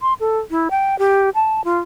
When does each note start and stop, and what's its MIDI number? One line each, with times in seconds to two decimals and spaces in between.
0.01 0.14 84
0.20 0.39 69
0.51 0.68 64
0.71 0.98 79
0.99 1.30 67
1.35 1.64 81
1.64 1.80 65